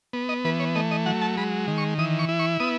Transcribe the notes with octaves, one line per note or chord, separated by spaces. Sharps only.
B3
D#5
E3 B4
C#5
A3 D#5
D#5
F#3 F#5
A5
G#3 B5
D#3
C#6
E3 D#6
C#6
E4
C#6
B3 D#6